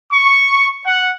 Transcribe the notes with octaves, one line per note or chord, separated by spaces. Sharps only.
C#6
F#5